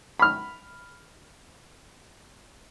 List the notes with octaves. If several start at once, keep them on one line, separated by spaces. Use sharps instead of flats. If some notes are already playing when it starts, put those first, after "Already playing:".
B5 F6